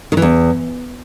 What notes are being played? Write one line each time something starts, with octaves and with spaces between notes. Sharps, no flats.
D#3
E3
E2